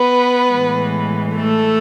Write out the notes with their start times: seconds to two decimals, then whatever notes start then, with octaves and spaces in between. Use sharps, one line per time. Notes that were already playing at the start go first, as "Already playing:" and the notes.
Already playing: B3 B4
0.49 A2 E3 G#3
1.35 A3 A4